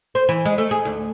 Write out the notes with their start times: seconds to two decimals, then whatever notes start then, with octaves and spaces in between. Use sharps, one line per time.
0.15 C5
0.29 E3
0.45 G#3
0.58 A3
0.71 G#4
0.85 D2